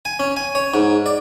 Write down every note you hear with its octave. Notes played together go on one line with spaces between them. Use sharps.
G#5
C#4
G#5
C#5
G#2
D5